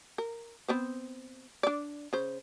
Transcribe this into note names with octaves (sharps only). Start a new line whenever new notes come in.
A#4
B3 C4 C5
D4 D5
C#3 C5